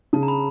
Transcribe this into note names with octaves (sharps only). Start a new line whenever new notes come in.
C#3 A5
A#5
B5